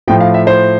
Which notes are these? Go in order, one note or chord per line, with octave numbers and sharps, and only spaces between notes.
A2 F3 G5
F5
E5
C5